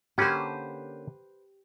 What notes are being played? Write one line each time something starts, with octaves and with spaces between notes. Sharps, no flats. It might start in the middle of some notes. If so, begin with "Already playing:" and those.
D3 A#3 C#4 G4 B4 C5